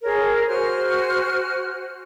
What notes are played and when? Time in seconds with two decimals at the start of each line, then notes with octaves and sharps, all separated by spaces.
0.03 G#4 A#4 C#5
0.48 F#4 C5 G#5 F6